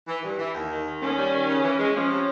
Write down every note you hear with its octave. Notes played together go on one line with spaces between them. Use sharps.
E3
G2
E3
D#2
D#3
D#3
D#2 C#4
G3
D#3
C#3
E3
G#3
F3 C#4
C3